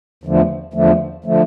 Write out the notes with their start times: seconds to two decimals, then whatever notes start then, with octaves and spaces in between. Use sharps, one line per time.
0.24 E2 D3 F3 A3
0.73 E2 D3 F3 A3
1.24 D3 F3 A3